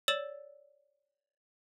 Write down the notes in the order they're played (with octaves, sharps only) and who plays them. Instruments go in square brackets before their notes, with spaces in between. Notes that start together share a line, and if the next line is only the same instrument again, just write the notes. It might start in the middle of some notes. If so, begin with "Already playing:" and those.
[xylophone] C#5 D5 E6 A6 E7 F#7